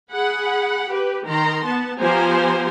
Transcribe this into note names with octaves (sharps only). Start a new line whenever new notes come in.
G#4 F#5 B5
G4 B4
D#3 A#5 C6
B3 A5
F3 B3 G4 C5 G#5 A#5